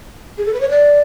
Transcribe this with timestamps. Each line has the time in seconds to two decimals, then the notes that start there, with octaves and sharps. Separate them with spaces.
0.38 G#4
0.46 A4
0.54 B4
0.61 C#5
0.70 D5